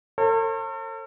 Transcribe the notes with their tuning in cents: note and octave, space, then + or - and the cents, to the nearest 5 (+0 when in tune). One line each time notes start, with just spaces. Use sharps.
A4 +45 C#5 -45